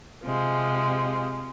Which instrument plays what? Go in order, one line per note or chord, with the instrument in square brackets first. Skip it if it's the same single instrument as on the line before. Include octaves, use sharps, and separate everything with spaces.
[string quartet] C3 F3 G#3